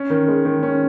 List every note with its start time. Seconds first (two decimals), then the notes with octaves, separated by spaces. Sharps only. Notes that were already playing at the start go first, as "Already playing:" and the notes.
Already playing: C#4
0.10 D#3
0.28 G#3
0.45 D#3
0.63 C#4